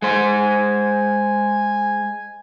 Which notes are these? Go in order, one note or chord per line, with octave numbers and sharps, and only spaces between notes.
G#3 C5 G#5